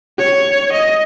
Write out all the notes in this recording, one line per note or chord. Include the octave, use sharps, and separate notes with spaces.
C#5
D#5